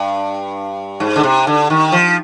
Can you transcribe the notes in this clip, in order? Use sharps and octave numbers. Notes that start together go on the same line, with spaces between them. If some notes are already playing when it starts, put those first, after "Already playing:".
Already playing: G2
G#2
D3
C3
D3
D#3
F3